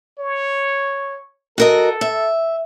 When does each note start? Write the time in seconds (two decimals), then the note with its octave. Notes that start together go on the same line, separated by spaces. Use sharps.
0.19 C#5
1.58 F#4 A4 A#4 D#5
2.01 E5